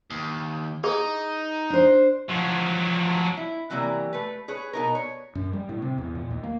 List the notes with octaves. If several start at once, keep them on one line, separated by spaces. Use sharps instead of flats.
D#2
D#4 G#4
D4 C5
F3 F#3
E4
C3 E3 F#3 G3 A#3
A3 B4
G#4 B4 C#5
B2 D#4 A#4
C#5
F#2
G3
A2
C3
E2
A#2
D#2
A#3